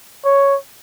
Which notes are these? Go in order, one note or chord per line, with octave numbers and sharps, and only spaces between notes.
C#5